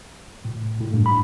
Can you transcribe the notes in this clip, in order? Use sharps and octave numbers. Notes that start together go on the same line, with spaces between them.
A2
A2
G2
B5